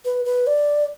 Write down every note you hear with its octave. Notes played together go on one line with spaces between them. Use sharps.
B4
B4
D5